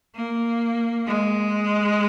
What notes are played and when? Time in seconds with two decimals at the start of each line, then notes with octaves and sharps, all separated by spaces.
0.16 A#3
1.07 G#3